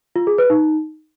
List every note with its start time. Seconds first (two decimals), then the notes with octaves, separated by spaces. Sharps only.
0.16 F4
0.27 G#4
0.38 B4
0.50 D#4